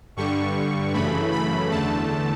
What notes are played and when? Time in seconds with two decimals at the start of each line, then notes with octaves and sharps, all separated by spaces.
0.17 G2 D3 G3 C#6
0.93 F#2 C#3 E3 A3 B5
1.32 B5
1.70 E2 D3 A3 A5